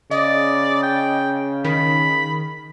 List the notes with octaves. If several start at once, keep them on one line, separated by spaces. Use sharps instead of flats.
C#3 D5 D#5
G5
D#3 B5